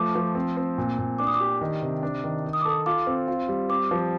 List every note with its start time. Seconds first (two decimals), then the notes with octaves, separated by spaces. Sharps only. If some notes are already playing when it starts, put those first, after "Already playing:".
Already playing: F3 A3 D6
0.15 F3
0.35 C4
0.57 C4
0.78 A#2
0.98 A#2
1.19 D4 D6
1.27 D#6
1.34 D6
1.40 G4
1.61 D#3
1.82 C3
2.03 D4
2.24 D#3
2.45 D#4
2.53 D#6
2.61 D6
2.65 A4 D#6
2.86 F4 D6
3.07 C4
3.28 F4
3.49 G3
3.69 C4 D6
3.91 F3